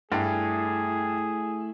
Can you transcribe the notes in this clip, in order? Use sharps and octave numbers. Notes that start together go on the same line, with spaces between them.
G2 A3 E4 G#4